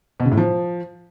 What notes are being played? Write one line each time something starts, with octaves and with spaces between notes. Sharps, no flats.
B2
C#3
A2
F3